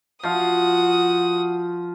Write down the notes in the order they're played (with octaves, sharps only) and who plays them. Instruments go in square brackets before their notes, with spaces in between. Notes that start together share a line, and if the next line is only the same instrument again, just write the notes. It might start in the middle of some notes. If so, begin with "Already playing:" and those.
[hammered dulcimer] F3 F5 [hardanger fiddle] F#4 D#6